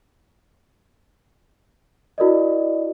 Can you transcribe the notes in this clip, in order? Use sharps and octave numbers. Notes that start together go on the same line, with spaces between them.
E4 F#4 A#4 D5 D#5